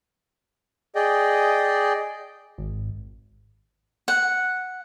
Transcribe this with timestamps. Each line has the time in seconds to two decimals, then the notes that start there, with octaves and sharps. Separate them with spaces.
0.95 G#4 D5 D#5 G5
2.58 G#1
4.08 F#5